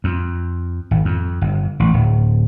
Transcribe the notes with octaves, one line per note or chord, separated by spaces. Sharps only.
F2
G#1
F2
G1
A1
D1